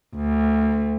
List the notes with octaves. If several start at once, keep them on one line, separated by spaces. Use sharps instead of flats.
D2